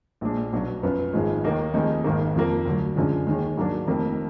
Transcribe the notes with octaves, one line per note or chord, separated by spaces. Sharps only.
A#1 A#2 G#3 D4
B1 B2 F#3 D4
F#2 F3 B3
G#1 G#2 F3 G#3
D#2 D#3 A#3 D#4
F1 F2 D#3 G#3 D#4
G#1 G#2 D#3 A#3
F2 F3 A#3
D2 D3 F#3
F#2 D3 F3 G#3
D#2 D#3 G#3
G#2 F#3 A#3 D4
F1 F2 D#3 A#3